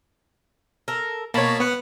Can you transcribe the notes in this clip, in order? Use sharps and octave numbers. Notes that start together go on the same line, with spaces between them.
A4 A#4
B2 A#3 C#5 A5 B5
B3 F#5